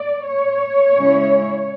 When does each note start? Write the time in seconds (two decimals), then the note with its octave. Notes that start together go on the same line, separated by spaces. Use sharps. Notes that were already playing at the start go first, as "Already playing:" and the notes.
Already playing: D5
0.26 C#5
0.95 C#3 G#3 C#4 E4